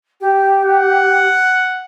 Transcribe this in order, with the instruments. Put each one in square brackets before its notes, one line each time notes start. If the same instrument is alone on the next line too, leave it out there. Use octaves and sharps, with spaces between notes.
[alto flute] G4
[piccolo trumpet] F#5